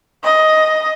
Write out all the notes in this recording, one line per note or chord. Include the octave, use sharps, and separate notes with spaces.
D#5